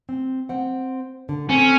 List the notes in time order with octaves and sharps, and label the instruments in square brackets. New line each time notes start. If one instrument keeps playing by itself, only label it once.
[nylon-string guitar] C4
C4 F#5
D3
[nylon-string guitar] C4 A4 [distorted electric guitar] C#4